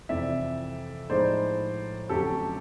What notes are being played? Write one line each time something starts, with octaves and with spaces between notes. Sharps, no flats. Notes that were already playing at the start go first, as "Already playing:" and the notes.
F2 C3 E3 D5 E5
A2 F3 G#3 B3 D#4 C5 D5
F2 D3 F#3 A3 C#4 G4 A4